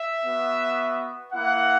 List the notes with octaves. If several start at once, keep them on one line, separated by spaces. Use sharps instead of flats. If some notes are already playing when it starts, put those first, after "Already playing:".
Already playing: E5
B3 F#4
A#3 E4 F#5